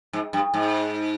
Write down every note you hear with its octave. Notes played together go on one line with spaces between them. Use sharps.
G#2
G2
G#2